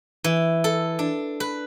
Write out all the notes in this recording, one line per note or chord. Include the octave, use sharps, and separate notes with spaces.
E3
A4
D4
B4